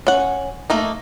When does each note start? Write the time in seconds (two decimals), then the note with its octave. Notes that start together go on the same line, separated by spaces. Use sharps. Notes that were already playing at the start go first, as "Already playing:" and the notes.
0.07 C#4 F#5
0.70 A3 A#3 D#4